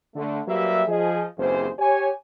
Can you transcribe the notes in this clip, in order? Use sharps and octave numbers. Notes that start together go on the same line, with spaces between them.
D3 A3
F#3 G3 A#3 G4 B4 E5
F3 G#4 D#5
F#1 D#2 E3 C4 G#4 C5
G4 C#5 G#5